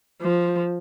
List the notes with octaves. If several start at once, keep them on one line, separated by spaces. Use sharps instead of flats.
F3